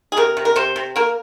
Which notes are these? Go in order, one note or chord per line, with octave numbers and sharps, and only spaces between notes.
G#4
C3 A#4
C3
A#4
C3 C5
C3
A#3 A#4